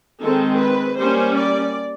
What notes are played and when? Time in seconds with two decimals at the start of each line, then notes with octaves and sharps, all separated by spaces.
0.20 D#3 G#3 C4 A4
0.58 B4
0.97 G3 A#3 C#4 C5
1.35 D5